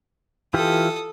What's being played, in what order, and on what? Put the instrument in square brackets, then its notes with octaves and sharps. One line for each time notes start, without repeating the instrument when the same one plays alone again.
[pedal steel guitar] E3 F4 G4 [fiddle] A4 D#6